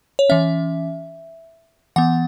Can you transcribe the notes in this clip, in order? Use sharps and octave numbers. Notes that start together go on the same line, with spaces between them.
C#5
E3 C#4 E5
E3 B3 F#5